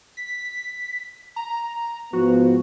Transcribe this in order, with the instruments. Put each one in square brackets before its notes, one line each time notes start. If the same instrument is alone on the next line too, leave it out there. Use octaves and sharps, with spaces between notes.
[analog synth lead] B6
A#5
[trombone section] G#2 F3 B3 [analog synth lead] F#4